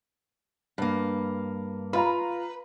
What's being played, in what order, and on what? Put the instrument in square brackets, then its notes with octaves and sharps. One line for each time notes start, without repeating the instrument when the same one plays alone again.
[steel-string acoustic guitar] G2 A#3
[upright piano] F4 F5 A#5 [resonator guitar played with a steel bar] B4